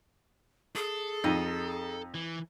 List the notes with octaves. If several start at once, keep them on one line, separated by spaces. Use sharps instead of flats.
G#4 A4
F2 D#4
E3